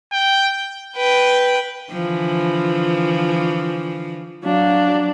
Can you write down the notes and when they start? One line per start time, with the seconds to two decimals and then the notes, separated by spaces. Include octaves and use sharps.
0.12 G5
0.96 B4 G5
1.91 D3 E3 F3
4.44 F#3 D4 F5